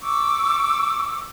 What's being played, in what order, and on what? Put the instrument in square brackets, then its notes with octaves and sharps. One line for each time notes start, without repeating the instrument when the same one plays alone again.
[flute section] C#6 D6 E6